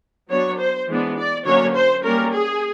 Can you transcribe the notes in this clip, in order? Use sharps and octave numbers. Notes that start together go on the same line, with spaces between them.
F#3 B3 D4 C#5
C5
E3 G#3 B3 D4
D5
D3 F#3 A#3 C#4 C#5
C5
G3 A#3 C#4 A#4
G#4